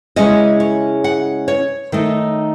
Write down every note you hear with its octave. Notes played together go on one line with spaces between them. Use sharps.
C#3 G#3 C#4 E4 D#5
C#5
F#5
C#5
D#3 A3 D#4